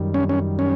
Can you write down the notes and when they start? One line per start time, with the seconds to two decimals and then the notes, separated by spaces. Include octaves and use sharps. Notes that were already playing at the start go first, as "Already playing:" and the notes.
Already playing: F#2 D#3 G3
0.14 C#4
0.29 C#4
0.59 C#4